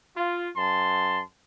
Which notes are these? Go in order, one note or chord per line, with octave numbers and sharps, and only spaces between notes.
F4
F#2 A5 C6